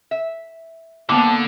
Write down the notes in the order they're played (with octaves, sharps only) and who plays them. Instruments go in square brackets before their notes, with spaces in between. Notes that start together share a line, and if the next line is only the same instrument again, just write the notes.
[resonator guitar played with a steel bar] E5
[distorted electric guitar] D3 [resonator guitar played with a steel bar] G3 D4 C5 [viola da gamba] A#3 B3 [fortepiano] D6